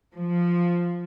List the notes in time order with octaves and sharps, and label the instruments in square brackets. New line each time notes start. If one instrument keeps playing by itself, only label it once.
[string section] F3